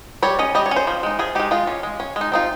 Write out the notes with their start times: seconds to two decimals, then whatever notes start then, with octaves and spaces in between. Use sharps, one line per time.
0.22 G3 C#5
0.39 C#4 D#5
0.55 G3 D#5
0.66 C#5
0.71 C#4
0.76 C5
0.87 F3
1.03 G#3 D#4
1.19 F3 G#4
1.35 G#3 D#4 G4
1.51 G#3 F4
1.67 C#4
1.83 G#3
2.00 C#4
2.16 G#3
2.21 D#4
2.32 C4 D#4 F4